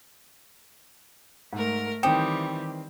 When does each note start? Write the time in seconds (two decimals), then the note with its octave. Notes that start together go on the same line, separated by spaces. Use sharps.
1.53 G#2 A3 A#4
2.03 D#3 E3 G3 C4 G4 G5 D#6 E7